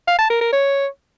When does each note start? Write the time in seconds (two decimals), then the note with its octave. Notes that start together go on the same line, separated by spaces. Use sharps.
0.07 F5
0.19 A5
0.30 A#4
0.41 A#4
0.52 C#5